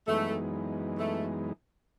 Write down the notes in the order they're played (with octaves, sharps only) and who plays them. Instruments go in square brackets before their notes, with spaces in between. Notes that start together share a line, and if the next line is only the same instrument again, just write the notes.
[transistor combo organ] F#2 E3 G#3 B3 D#4 [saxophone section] A3
[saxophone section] A3